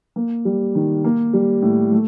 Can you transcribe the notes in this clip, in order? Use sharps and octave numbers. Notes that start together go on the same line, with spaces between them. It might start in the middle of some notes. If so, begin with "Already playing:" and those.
A#3
G3
D#3
A#3
G3
A2
A3